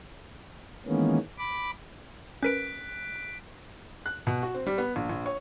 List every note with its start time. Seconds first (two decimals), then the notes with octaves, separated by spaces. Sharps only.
0.86 D#3 E3 G#3 A#3 B3 C#4
1.38 B5 D6
2.43 C#4 A#4 B4 F#6 B6 D7
4.06 F#6
4.27 B2
4.43 F#4
4.55 C4
4.67 G3
4.78 B3
4.96 A#1
5.10 A#1
5.26 C#5